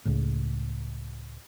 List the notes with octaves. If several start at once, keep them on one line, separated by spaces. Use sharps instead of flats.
C#2 A2